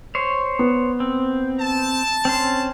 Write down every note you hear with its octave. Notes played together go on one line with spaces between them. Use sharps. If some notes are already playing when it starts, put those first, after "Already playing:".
C5 C#5
B3
C4
A5
C4 C#4 C6